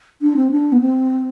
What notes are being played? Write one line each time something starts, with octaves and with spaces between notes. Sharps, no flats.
D4
C4
D4
B3
C4